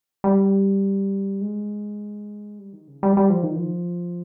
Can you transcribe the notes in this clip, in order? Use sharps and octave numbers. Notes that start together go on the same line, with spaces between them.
G3
G#3
G3
D#3
C#3
G3
G3
F3
D#3
F3